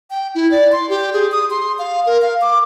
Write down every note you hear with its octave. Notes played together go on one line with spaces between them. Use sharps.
G5
E4
D5
C6
G4
G#4
D#6
C6
F5
A#4
F5
D6